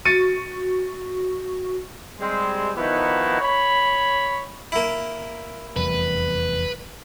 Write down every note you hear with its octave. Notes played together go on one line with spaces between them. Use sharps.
F#4 A6 C#7 D#7
G3 G#3 C4
D#3 F3 B3 D#4 E4 F#4
C#5 B5
A#3 E4
F1 E2 G3 B4